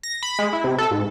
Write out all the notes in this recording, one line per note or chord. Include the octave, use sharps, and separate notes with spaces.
A#6
B5
G#3
E4
C3
A4
G#2